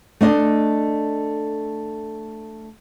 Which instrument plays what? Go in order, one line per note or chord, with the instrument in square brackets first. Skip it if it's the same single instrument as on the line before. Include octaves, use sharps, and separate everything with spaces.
[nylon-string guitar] A3 D4 D#5